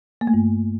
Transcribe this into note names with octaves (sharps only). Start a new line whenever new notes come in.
A#3
A3
G2